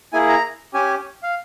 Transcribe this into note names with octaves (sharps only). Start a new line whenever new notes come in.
A#3 E4 G#4 G#5
A#5
C#4 G4 G#5
F5